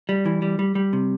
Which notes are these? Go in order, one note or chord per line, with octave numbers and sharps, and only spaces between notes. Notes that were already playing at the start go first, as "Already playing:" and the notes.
G3
E3
G3
G3
G3
C3